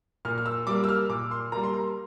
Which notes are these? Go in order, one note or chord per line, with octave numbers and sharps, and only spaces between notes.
A#2 F6
F6
E6
G3 A#3 D6
E6
F6
A#2 D6
C6
G3 A#3 A#5
C6
A#5